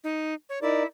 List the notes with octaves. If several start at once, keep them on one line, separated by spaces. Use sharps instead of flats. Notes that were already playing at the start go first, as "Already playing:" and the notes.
D#4
C#5
D#4 E4 A#4 D5